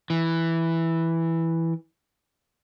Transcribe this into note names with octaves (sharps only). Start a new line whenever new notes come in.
E3